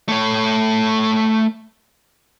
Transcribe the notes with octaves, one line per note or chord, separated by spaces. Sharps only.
A3 C#5